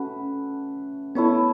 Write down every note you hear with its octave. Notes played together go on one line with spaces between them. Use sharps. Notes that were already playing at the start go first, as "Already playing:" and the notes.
Already playing: A3 C#4 F#4 B4
A3 B3 E4 C#5